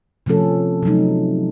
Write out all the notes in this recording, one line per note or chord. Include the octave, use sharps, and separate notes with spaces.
C3 F3 A3 C#4 A4
C3 F#3 A3 D#4